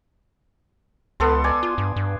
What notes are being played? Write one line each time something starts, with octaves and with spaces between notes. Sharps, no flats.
C#2 B3 A4 C6
D5 G#5
F4
G2
G2